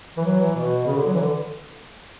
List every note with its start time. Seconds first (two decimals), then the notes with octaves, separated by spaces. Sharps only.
0.17 E3
0.24 F#3
0.39 E3
0.55 B2
0.86 C#3
0.96 D3
1.06 F#3
1.13 E3
1.21 D3